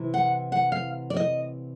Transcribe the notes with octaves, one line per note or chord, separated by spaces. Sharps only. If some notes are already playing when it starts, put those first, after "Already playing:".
Already playing: C3 E3
F#5
F#5
F5
D5
D#5